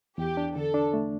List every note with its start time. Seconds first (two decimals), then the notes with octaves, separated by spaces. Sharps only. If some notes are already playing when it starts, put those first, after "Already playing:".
0.18 E2 G4
0.37 D4
0.55 D3 A4
0.74 D4
0.93 A3